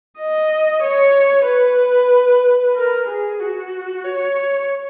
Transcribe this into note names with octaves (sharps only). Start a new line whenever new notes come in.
D#5
C#5
B4
A#4
G#4
F#4
C#5